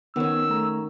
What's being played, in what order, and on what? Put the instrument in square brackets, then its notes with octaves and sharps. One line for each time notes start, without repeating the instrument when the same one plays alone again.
[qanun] D#3 F#3 C#4 [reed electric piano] B3 F#5 [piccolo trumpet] E6
[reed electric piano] A3 A#5